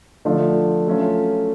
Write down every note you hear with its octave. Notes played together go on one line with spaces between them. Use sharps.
D3 F3 A3 D4 F4
F#3 A3 C#4 F4